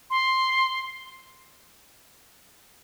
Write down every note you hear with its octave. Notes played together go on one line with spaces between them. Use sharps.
C6